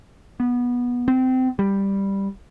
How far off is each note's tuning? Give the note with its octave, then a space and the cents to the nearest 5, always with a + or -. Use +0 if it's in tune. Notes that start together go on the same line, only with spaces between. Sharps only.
B3 -15
C4 -25
G3 +5